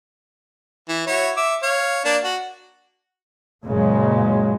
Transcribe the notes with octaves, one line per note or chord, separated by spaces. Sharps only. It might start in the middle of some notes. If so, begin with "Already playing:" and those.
E3
E4 F#4 C#5
E5 D6
C#5 F5
A#3 D4
F#4
F#1 A#2 C#3 G#3